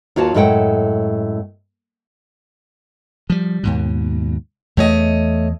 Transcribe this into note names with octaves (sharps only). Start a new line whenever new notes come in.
D#2 F4 F#4 C#5 A5
F#2 A2 G#3 A4 F#5 G5
F3 G3
D#2 G#2 B2
E2 A3 C#5 D#5